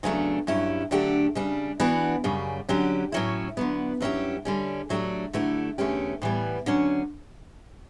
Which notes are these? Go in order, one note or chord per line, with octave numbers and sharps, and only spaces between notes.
E2 C#3 F#3 A3 D4
G2 F#3 C#4 E4 G4
D3 F#3 A3 D4 G4
C#3 G3 D4
E3 B3 D4 F#4
F#2 C#3 G3
D3 F#3 C#4 G4
A2 F#3 C#4 E4
D3 F#3 B3
G2 F#3 C#4 E4 G4
D3 G3 C#4
A2 F#3 A3 D4 G4
D3 F#3 A3 E4 G4
E2 D3 A3 C#4 G4
A2 E3 G3 B3
D3 F#3 C#4